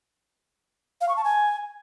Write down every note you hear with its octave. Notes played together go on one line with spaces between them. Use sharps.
F5
C#6
A5
G#5